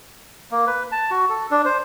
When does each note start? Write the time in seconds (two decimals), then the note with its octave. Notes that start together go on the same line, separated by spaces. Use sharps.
0.51 A#3
0.67 B4
0.92 A5
1.11 F#4
1.29 A4
1.51 D4
1.65 C5